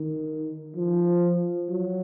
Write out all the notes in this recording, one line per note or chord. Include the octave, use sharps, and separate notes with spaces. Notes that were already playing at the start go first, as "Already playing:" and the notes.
Already playing: D#3
F3
F#3